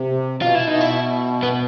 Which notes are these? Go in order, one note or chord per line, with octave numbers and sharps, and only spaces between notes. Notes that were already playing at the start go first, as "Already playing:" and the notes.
Already playing: C3
B2 F4
E4
B2 D#4
E4
B3